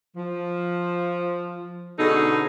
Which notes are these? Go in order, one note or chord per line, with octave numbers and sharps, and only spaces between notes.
F3
B2 D3 C#4 D#4 G#4 A4